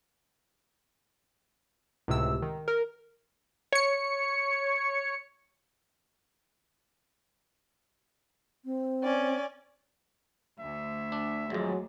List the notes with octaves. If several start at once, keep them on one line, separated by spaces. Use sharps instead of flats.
C#2 A2 C3 E6
D#3
A#4
C#5 C#7
C4
C#4 D5
D2 E5
D4
G#1 F2 F#3 G#3